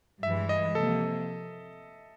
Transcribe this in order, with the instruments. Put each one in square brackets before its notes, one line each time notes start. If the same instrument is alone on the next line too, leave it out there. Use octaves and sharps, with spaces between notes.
[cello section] G2 E3 G#3 [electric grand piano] E5
[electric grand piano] D#5
[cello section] C3 F3 A#3 [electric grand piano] A4